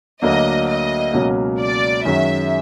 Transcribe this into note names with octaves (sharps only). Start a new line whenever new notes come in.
D2 D3 F#3 A#3 D4 D#5
D#5
C#2 B2 F#3 A#3 C#4
D5
F#2 D#3 G#3 C#4 F#4 E5